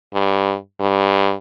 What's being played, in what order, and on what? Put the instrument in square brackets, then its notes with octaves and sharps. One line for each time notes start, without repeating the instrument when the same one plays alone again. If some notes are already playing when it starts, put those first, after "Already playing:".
[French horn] G2
G2